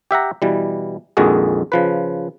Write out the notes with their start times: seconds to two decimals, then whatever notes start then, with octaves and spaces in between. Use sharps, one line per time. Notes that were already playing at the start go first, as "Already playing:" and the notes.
0.11 G4 E5 F#5 A#5
0.42 B2 E3 G3
1.17 A#1 F2 D#3 G#3 F#4 G#4
1.72 C#3 F3 B4